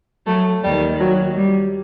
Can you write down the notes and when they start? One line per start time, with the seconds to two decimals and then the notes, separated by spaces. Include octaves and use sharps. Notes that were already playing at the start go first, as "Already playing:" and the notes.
0.26 F#3 A3
0.63 D#2 D#3 G3
1.00 F#3
1.36 G3